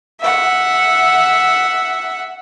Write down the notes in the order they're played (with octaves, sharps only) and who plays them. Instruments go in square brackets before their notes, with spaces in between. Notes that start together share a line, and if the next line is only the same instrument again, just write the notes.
[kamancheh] E5 F#5